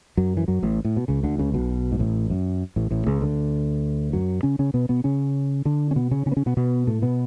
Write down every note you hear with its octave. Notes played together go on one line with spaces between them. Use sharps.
F#2 F#3
E3
F#2 F#3
A1 A2
A2
B2
C#2 C#3
D2 D3
C#2 C#3
B1 B2
G#2
A1 A2
F#2
A1 A2
A1 A2
C#2 C#3
D2 D3
F#2 F#3
C#3 C#4
C#3 C#4
B2 B3
B2 B3
C#3 C#4
D3 D4
C#4
B2 B3
C#3 C#4
C#3 C#4
B3
C#3 C#4
B2 B3
B2 B3
A2 A3
B2 B3